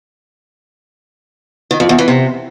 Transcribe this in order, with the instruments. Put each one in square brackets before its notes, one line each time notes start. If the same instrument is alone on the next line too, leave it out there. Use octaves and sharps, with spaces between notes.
[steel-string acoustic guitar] D#3
F2
E2
E3
C3